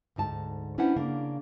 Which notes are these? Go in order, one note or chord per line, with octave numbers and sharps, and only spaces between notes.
D2 G#2 D#4 A5
C#4 D4 E4 B4 C5 F#5
C#3 A#3 D4